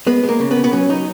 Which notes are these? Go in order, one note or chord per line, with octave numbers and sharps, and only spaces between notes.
G#3 B3
G#3
A#3
C#3
B3
C#3
B3
F#3 C#4
F#3 D#4